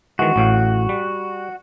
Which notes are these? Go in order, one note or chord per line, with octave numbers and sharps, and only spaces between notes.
D#3 E3 G#3 F#4
A1 A2 F5
G3